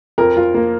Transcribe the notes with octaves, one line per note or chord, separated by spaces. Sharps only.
F2 A#4
F4
A#3